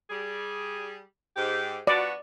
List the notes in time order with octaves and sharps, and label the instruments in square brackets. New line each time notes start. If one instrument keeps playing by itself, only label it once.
[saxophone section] G3 G#4
G#2 G4
[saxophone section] F3 B3 F#4 [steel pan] D5